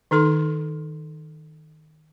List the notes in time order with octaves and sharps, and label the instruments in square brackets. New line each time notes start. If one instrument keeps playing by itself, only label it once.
[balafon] D#3 D#4 A4 C6